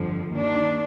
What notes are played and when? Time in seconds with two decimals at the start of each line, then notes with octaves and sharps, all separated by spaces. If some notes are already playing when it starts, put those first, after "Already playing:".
Already playing: G1 F2 D3 F3
0.34 D#2 D#3 D4